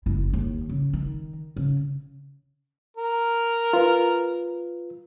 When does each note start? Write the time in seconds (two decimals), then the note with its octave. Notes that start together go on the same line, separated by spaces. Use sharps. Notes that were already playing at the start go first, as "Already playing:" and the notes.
0.06 F#1 E4
0.33 D#2
0.69 C#3
0.93 D#3
1.56 C#3
2.97 A#4
3.73 F4 B4